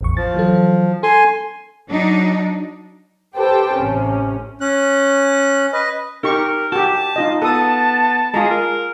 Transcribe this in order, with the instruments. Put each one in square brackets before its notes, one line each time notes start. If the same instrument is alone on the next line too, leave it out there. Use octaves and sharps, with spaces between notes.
[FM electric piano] A1 E2 C#6
[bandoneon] F3 [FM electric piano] A6
[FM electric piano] E3 F#3 A4
[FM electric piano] A4 [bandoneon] G#5 C6
[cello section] F#3 D4 D#4
[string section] G4 A4 B4 C5 G5 A5
A1 C3 C#4
[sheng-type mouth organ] C#4 F#6
B4 D#5
[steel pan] D#4 G4 C#6 [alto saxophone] A#4
[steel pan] F#4 G4 [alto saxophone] A5
[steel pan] D#4 F4 D#5
[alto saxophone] B3 [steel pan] A4 D#6 [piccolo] A5
[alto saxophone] G#3 [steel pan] F4 G#4 A#5
[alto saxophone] A#4